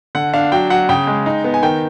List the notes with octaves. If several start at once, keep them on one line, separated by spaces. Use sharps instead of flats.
D3 F#5
D4 F5
F#3 G5
F#3 F#5
C#3 G5
G#3
D#4
B3
G#5
D#3 G5